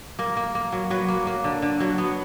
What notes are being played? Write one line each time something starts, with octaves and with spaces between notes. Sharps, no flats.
A#3 A#4
A#3
A#3
F#3
F#3 B4
A#3
A#3
D3
D3
F#3
B3